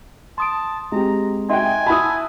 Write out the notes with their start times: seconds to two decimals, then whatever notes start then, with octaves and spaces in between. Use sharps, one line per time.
0.38 A5 C6 D#6 D7
0.92 G#3 C4 G4 A#5
1.49 D#4 F#4 E5 G5 G#5 C6
1.86 E4 F#4 A5 B5 D#6